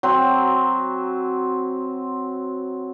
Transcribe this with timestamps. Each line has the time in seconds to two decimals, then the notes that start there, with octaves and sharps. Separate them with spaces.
0.03 F#3 C4